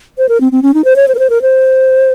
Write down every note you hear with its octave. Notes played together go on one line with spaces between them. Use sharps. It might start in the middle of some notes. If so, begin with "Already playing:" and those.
C5
A#4
C4
C4
C#4
D#4
C5
C#5
C5
A#4
C5
A#4
C5